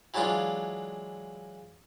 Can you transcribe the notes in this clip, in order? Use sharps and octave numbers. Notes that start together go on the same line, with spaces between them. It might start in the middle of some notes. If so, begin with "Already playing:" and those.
E3 F#3 G#3 D4 F4